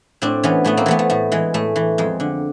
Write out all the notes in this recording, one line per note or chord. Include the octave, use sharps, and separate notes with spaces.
A2 C4 D4
E3 B3 C#4
A2 A3 B3
A#3 C4
E3 A3 B3
A3
A2 A3
E3 G#3
A2 A3
E3
F2 G#3
D3